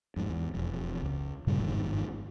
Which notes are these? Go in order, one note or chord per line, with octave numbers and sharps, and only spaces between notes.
F2 G#2
E2
E1 F2
C#2
G2 A#2 C#3 G3
G1 F2 G#2 D#3